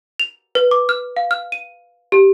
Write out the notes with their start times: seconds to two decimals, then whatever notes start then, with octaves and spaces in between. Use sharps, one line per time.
0.20 F7
0.55 B4
0.71 D6
0.89 F6
1.17 F5
1.31 F6
1.52 D#7
2.12 G4